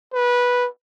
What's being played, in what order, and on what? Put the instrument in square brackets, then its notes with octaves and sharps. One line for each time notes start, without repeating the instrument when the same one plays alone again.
[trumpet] B4